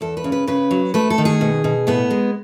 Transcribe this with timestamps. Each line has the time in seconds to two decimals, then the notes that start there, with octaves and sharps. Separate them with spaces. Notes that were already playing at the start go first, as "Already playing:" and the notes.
0.01 E2 A4
0.17 B4
0.24 C#3
0.32 B4
0.47 C#3 B4
0.71 F#3
0.94 A3 B4
1.10 A4
1.18 D#3
1.25 G#4
1.41 B2
1.64 B2
1.87 A2 B3
2.11 G#3